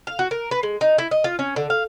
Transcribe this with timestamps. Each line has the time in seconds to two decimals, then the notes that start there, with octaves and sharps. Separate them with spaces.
0.07 F5
0.19 F#4
0.31 A#4
0.51 B4
0.63 G#3
0.81 D#4
0.98 E4
1.11 D#5
1.24 F4
1.39 C#4
1.56 D3
1.70 F5